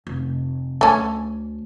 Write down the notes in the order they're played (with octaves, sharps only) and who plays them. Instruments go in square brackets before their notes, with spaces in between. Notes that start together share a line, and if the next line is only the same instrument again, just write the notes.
[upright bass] F1
[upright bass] D2 [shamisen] C#4 A4